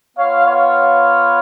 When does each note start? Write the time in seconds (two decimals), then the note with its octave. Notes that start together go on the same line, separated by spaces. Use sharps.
0.18 B3 F4 C#5 F5
0.47 C#5 F5